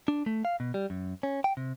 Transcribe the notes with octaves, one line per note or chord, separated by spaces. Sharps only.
D4
A3
F5
B2
G3
F#2
C#4
G5
C3